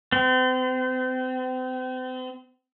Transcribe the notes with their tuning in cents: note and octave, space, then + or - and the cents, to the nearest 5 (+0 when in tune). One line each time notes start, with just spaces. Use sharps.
C4 -35